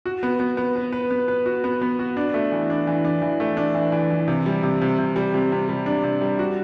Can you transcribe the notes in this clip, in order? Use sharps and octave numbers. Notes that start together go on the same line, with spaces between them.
F#4
B3
B3
B3
B4
B4
B3
B4
F#4
B3
B3
F#4
D4
A3
E3
D4
E3
D4
E3
A3
D4
E3
E3
E3
C3
G3
C3
C3
C3
G3
C3
C3
G3
D4
C3
G3
F#4